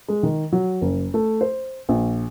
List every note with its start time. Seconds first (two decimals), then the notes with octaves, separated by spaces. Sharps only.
0.09 G#3
0.23 D#3
0.52 F#3
0.81 F#1
1.14 A3
1.41 C5
1.89 A#1